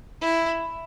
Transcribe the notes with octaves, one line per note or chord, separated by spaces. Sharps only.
E4